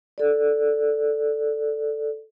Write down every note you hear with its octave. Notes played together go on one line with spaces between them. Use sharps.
A4 D5